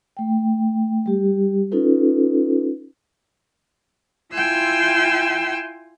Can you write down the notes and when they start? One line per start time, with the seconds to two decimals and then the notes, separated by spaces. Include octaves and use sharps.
0.17 A3 G5
1.06 G3 G4
1.71 C#4 D#4 F4 A4 B4
4.33 E4 F4 G5 G#5 C6 E6